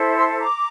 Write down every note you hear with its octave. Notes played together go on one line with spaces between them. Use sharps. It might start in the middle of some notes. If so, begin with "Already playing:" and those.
Already playing: E4 A4 C5
C6 E6
A#5 D6